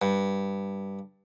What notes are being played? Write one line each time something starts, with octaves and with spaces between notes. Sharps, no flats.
G2